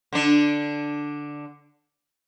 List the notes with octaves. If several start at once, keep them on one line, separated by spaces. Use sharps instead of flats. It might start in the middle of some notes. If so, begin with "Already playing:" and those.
D3 D4